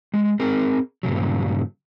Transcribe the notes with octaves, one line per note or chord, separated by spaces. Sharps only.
G#3
C4 G#4 A#4
G2 A#2 C#3 F#3